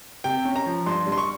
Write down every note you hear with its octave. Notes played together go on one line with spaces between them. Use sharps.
C3 G5
C#4
A#5
F3
G2 C6
G3
C6
C#6